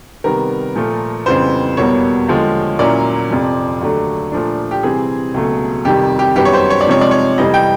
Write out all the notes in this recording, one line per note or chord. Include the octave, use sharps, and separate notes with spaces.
C3 D#3 G3 B3 A#4
A#2 F3 A3
F2 C#3 E3 G3 B3 C5
E2 B2 G3 A#3 C#5
D#2 D3 F3 G#3
A#2 F#3 A#3 C#4 E4 D5
F2 C3 F3
D#2 D3 F#3 A3 D4
A#2 F3 A3 D4
G4
C3 E3 G3 C4 G#4
C#2 B2 F#3 A3
F2 C3 D#3 G3 G4
G4
F#2 D#3 G3 B3 G4
C#5
C5
C#5
D5
C3 F3 G#3 C4 D#4 C#5
D5
C#5
F2 C3 E3 G3 D#5
G5